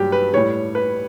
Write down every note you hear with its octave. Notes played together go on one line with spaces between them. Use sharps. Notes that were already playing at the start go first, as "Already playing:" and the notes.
Already playing: G2 F#3 G4
B4
A2 G3 C#5
B4